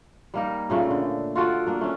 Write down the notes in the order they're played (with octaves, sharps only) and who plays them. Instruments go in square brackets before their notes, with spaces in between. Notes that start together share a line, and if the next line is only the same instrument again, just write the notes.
[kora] G3 A#3 D#4
A#2 C#3 A3 C#4
D3
F4 F#4 A4 D5
A#3 D4
A3 C#4